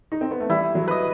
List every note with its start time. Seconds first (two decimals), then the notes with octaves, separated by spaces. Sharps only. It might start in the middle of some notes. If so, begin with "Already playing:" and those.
0.12 D#4
0.21 C4
0.31 B3
0.40 A3
0.50 G3 E4
0.75 F#3
0.88 B4 D#5